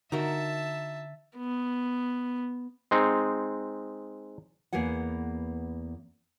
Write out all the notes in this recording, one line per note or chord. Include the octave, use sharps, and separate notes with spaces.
D3 D#4 F#4 A#4 E5 A5
B3
G#3 C4 D#4
E2 A#3 B3 G#4 F#5